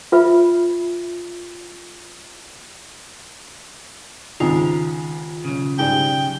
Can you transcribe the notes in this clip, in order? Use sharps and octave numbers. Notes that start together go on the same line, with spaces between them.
F4 B4 E5 B5
C#2 G#2 C3 D#3 F4
B1 C#3
G#2 G3 G5